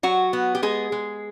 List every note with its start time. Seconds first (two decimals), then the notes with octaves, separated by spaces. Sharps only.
0.03 F#3 F#4
0.33 B3
0.55 G4
0.62 G#3 G#4
0.92 G#3